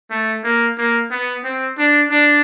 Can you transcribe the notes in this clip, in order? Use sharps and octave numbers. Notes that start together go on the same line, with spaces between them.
A3
A#3
A#3
B3
C4
D4
D4